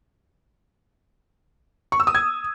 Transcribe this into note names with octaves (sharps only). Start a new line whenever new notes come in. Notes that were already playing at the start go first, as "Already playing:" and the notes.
C#6
E6
D#6
G#6